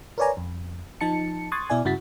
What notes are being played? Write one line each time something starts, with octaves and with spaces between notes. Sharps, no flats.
A#4 B4 C#5 D5 G#5 A#5
F2
F3 D#4 A5 C#7
C6 C#6 D#6 F#6 G#6 A6
B2 E4 D5 G#5
G2 C#3 E4 F#4 A6 B6